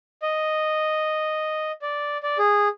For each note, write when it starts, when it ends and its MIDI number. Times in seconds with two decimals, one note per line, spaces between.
0.22 1.72 75
1.82 2.18 74
2.23 2.38 74
2.39 2.68 68